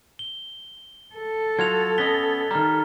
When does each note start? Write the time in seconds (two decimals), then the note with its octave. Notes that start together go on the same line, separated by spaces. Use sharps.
0.19 G7
1.15 A4
1.59 F#3 F4 F#4 G#6 F7
1.98 B3 C#4 D#5 B6 G7
2.51 D#3 G3 A#5 F6